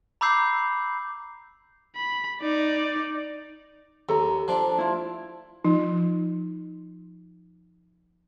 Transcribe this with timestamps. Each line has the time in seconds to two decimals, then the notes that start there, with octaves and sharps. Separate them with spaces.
0.21 A#5 B5 D6 E6 G6 C7
1.96 B5
2.41 D#4 D5
4.09 D#2 A4 A#5
4.48 F3 D4
4.78 E4 F4
5.64 F3 D#4 F4